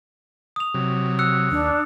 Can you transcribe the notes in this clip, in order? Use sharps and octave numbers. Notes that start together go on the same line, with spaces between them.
D#6 F7
C3 F#3
E6 F#6 C#7
D#2 D4